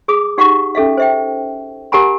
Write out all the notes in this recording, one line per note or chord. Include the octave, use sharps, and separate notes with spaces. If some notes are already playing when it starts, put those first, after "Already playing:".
G#4 D6 D#6
D#4 G4 F5 F#5 A5 C#6
C#4 A4 E5 F5
C5 E5 G5
G4 A#4 F#5 G#5 A#5 B5